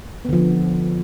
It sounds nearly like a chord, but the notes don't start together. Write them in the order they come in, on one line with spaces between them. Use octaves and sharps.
B3 D3 F3